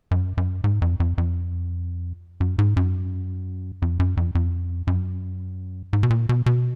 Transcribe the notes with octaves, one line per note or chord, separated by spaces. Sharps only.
F#2
F#2
G#2
F2
F2
F2
F#2
G#2
F#2
F2
F#2
F2
F2
F#2
G#2
B2
A#2
B2
B2